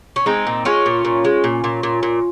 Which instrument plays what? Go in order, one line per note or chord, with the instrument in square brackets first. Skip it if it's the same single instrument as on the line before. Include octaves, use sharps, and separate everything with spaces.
[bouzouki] C#4
G#3 C4 D#4
A#2
G#3 C#4 F4
A#2
A#2
G#3
A#2
A#2
A#2
A#2